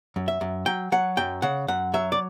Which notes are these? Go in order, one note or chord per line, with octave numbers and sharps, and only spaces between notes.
F#2
E5
F#2
F#3 G5
F#3 F#5
F#2 G5
C#3 F#5
F#2 F#5
F#3 E5
D5